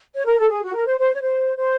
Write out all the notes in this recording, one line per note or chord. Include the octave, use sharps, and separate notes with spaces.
C#5
A#4
A4
G#4
F#4
A#4
C5
C5
C#5
C5
C5